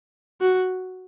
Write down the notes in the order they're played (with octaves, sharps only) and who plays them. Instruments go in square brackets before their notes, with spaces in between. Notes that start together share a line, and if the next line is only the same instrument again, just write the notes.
[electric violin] F#4